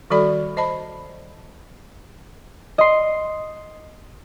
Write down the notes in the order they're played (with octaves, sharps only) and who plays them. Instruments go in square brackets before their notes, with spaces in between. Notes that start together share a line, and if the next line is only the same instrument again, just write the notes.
[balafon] D#3 G3 F#4 A4 D5 B5
C5 D#5 A5 B5
[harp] D#5 C6